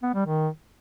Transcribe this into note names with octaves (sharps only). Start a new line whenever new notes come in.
B3
G3
D#3